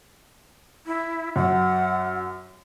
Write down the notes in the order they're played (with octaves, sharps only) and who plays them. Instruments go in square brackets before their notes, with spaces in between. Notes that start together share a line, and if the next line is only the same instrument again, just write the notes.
[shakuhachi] E4
[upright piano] F#2 [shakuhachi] F#5